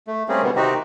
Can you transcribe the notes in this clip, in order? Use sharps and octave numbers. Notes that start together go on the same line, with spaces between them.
A3
G3 A3 A#3 C4 C#4 G#4
B2 D3 G3 B3
C3 D#3 C4 D#4 F#4 G4